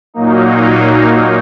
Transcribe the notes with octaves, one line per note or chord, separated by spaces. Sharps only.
A#2 F#3 A#3 D#4